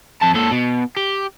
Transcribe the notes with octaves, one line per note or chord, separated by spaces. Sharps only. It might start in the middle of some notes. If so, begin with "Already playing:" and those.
F2 A5
A#2 A4
B2
G4